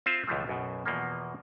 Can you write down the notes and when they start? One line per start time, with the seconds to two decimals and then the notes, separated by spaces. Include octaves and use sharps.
0.06 C4 F4 C5 E5
0.27 C#2 B2 E3 F3 A3
0.48 B1 F#2 B2
0.85 E2 B2 F3 A#3